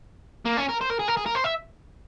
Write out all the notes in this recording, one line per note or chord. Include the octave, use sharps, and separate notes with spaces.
A#3
C#4
A#4
C5
A#4
G#4
A#4
G#4
A#4
C5
E5